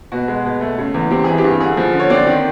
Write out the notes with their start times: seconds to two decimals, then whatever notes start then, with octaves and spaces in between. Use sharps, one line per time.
0.12 B2 F#4
0.28 G#3
0.45 B2
0.61 A3
0.78 C#3
0.94 E2
1.11 C4 G4
1.24 E3 G#4
1.38 G4
1.44 G2
1.60 D3 G#4
1.77 F3
1.94 D3
2.00 C#5
2.10 C4 D5
2.27 D#3